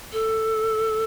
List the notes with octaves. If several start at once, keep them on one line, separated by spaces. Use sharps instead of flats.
A4